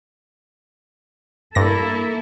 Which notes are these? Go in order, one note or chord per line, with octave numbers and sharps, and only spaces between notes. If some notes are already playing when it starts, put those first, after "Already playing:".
G2 A#3 E4 A4 A#6